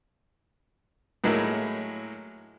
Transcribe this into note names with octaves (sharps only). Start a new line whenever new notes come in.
A2 F#3 G#3 A#3 E4